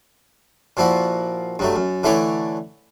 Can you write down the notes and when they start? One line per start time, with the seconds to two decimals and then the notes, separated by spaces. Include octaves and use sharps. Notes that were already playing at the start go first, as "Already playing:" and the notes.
0.77 A#2 F3 E4 F#4
1.59 G2 F#3 A3
1.76 F#2
2.03 D3 E3 A3 E4 C#5 D5